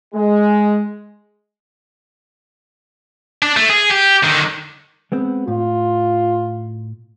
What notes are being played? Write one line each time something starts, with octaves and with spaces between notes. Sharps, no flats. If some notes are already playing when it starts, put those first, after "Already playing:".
G#3
D4
A3
G#4
G4
D3 D#3
G#3 B3 C4
A2 F4